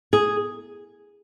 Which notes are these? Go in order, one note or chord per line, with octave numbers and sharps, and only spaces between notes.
G#4